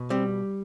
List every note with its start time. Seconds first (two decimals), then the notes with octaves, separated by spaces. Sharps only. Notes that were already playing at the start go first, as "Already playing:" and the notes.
Already playing: B2
0.10 G3 C4